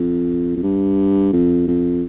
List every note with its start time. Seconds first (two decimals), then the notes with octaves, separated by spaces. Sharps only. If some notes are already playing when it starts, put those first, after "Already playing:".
Already playing: F2
0.56 F2
0.63 G2
1.33 F2
1.67 F2